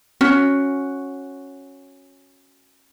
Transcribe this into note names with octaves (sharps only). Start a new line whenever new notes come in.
C#4 F#4